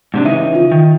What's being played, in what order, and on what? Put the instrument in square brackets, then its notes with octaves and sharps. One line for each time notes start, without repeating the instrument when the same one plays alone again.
[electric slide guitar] G#2 C3 D4
[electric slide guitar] C#3 E3 D#4 [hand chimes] E5
[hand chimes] F4
[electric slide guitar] D#3